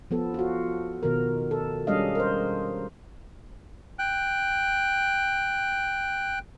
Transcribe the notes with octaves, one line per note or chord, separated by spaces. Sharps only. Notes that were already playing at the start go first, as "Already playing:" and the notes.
F3 B3 A4
F4 F#4
B2 D#3 A#4
A4
G3 G#3 C#4 D4 D#5 F5
A#4 C5
G5 F#6